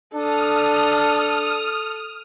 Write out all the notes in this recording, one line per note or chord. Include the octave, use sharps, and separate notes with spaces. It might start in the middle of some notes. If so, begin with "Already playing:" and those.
D4 A4 D#6 F6